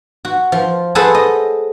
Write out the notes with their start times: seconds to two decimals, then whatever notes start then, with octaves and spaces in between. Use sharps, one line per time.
0.25 F#4
0.52 F3
0.95 G#4 A4 B4 C5 F#5 A5
1.15 D#5